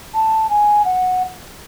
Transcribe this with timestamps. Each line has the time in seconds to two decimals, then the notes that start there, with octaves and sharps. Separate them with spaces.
0.14 A5
0.49 G#5
0.85 F#5